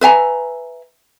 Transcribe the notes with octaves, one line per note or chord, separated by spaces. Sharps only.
B4 E5 G#5 A#5